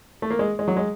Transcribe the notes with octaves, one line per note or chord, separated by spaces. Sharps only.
A3
A#3
G#3
G#3
F#3
G#3